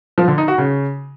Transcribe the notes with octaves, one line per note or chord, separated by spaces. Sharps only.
F3
D3
D#4
F#4
C#3